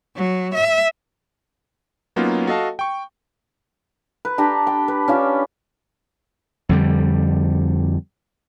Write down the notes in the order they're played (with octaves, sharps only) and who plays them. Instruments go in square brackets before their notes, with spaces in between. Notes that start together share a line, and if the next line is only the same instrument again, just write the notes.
[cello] F#3
E5
[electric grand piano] F#3 A#3 B3 C#4 D#4 F4
F#4 A4 D#5 F5 A5
G5 C#6
[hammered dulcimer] B4
D4 G4 A5 A#5
G5
B4
C#4 D4 F4
[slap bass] F2 D3 G3